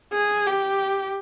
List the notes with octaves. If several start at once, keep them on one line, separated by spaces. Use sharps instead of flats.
G#4
G4